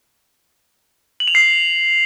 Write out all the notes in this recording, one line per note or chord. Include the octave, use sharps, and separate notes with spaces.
F#7
F7
C7